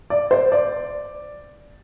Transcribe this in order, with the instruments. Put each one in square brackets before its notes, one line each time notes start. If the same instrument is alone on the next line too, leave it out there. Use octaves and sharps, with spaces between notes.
[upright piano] D5
C5
D5